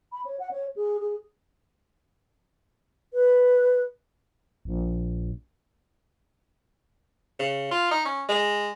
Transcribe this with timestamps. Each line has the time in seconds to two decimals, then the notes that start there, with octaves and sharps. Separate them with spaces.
0.12 B5
0.25 C#5
0.39 F#5
0.51 C#5
0.76 G#4
1.00 G#4
3.14 B4
4.65 A#1
7.39 C#3
7.71 F4
7.91 D#4
8.05 C#4
8.29 G#3